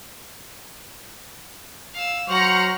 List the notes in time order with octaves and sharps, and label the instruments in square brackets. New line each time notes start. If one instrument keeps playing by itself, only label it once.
[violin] F5 E6
[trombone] F#3 [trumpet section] C5 C#6 [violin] F#5 [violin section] A#5 F6